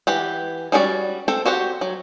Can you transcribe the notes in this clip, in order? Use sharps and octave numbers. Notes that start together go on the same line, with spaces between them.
E3 G4 F#5
G3 C#4 F#4 A4 D5
C4 A4 C5
F#4 G4 C5 F#5
F#3